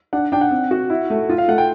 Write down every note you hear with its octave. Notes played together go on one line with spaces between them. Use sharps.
D4 F#5
D4 G5
F#5
C4
F#4
E4
A3
F4
F5
A3 F#5
G5